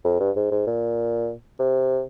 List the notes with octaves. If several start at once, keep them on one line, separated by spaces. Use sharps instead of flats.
F2
G2
G#2
G#2
A#2
C3